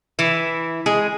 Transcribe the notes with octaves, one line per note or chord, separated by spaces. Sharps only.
E3 E4
G#3 G#4